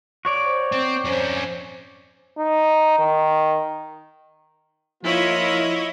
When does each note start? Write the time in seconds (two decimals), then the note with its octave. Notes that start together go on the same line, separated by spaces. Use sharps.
0.25 F#4 C#5 D5
0.45 C5
0.72 C4
1.05 F2 C#4 C5
2.38 D#4
2.99 D#3
5.04 F3 A#3 E4 F4 C#5 D#5